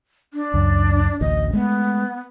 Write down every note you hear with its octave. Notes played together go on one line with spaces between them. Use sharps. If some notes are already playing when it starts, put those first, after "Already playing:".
D4
C#2 F#2
A1 D2 D#5
G#3 A3 B3